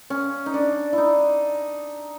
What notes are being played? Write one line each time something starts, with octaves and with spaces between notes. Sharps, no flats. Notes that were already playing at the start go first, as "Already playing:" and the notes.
C#4
D#4
D4
D#4 E4